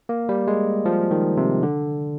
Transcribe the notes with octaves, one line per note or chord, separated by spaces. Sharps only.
A#3
G3
G#3
F3
D#3
C3
D3